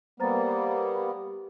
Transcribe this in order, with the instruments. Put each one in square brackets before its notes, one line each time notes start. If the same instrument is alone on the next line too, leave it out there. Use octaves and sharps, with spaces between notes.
[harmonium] G3 A#3 B3 [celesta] C5 A#5 A6
[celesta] G4